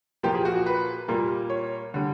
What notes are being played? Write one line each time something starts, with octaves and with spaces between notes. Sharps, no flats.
A#2 F3 A#3 G4
G#4
F#4
F#4
B4
A#2 G3 A#3
C#5
D3 G3